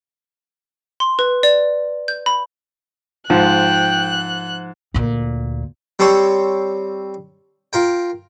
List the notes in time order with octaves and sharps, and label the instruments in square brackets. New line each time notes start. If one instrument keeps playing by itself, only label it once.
[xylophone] C6
B4
D5
G6
B5
[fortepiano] G#2 [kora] F3 [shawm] G5 [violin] F#6
[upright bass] D2 A#2
[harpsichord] G3 C4 A4 C5 C#5
F4 A#4 G5